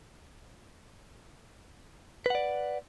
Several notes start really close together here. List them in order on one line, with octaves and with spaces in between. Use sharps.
B4 F#5 D5